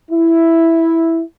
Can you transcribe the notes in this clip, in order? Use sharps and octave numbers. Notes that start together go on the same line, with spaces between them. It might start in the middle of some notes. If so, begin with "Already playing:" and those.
E4